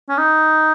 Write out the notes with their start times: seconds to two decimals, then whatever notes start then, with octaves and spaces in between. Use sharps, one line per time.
0.09 C#4
0.18 D#4